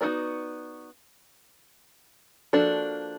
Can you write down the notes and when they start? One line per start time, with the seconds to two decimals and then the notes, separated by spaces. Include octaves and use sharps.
0.01 B3 D#4 F#4 A#4 D5
2.53 F3 A#3 D4 F#4 A4